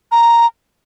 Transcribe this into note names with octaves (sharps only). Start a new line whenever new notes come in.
A#5